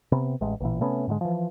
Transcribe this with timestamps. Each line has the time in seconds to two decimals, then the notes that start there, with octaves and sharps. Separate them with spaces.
0.12 C3 B3
0.41 A1 G#3
0.60 A1 A#2 E3
0.81 C3 A3 B3 C#4
1.07 G#2 D3 E3 G#3
1.21 E3 F3